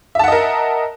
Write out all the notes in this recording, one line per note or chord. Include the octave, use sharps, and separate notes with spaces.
A#4 D#5 E5 F#5 A5